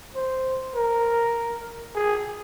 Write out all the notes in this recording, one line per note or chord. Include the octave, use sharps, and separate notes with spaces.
C5
A#4
G#4